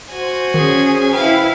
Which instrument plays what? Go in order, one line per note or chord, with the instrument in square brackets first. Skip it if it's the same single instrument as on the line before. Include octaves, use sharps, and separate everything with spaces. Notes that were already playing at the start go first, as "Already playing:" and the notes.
[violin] F#4 G#5 [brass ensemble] C5
[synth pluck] D#3 [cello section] C#4 G#4
[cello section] E4 B4 [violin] F5 [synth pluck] G5